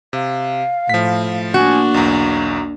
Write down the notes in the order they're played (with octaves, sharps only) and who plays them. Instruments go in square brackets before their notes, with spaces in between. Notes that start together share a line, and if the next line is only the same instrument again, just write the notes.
[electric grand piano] C3 [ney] F5
[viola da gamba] A2 [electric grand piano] F3 B6
[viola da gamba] A#3 D4 [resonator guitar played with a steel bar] F#4 [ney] G#5
[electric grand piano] B1 E2 [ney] A#5